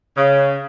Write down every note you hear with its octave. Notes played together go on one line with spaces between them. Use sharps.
C#3